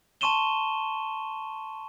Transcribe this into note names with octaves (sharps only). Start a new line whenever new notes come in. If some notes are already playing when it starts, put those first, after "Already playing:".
A5 C6 C#6 D#7 E7 G7